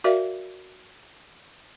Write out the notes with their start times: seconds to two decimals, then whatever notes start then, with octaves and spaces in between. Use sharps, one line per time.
0.04 F#4 A#4 D5 E5 F5